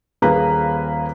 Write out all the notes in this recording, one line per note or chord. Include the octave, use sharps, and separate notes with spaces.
D#1 A#3 G#4 B4 F5 A#5